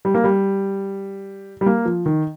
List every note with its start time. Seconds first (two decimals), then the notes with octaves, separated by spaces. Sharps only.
0.05 G3
0.14 A#3
0.24 G3
1.61 G3
1.66 A#3
1.85 F3
2.06 D#3